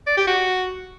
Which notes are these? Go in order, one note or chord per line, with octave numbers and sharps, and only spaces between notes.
D5
G4
F#4